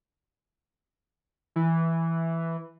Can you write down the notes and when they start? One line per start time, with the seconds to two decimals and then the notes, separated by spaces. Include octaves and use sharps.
1.56 E3